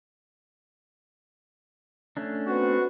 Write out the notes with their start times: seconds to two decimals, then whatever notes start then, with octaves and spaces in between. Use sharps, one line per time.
2.17 A3 C#4 D4
2.47 B3 C4 F#4